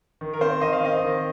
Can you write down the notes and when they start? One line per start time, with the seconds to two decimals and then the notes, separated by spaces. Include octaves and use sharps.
0.21 D#3
0.33 A#4
0.41 C4 C5
0.61 D#3 D#5
0.73 F5
0.82 C4 D#5
1.01 D#3